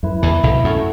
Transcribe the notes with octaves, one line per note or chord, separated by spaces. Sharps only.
F#2 E4 B4 E5
E2 E3
B1 B2
F#2 A3 F#4 C#5 E5